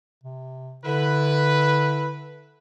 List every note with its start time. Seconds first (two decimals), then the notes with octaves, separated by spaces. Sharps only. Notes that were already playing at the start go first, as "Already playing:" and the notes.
0.23 C3
0.85 D3 E4 B4